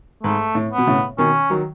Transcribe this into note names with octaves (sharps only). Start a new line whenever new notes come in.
G#2 A3
A2
B3
B2
A2 C#3
B2 D#3 C#4
D#3 F#3